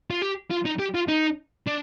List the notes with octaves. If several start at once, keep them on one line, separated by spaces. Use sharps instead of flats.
F4
G4
F4
D#4
G4
F4
D#4
D4